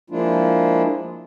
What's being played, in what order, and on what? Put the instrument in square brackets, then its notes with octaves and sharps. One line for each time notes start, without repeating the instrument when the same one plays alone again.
[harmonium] F3 G#3 A#3 D4 E4 F4